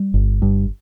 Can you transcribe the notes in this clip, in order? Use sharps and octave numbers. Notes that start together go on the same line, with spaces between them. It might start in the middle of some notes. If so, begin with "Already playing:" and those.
Already playing: G3
G1
G2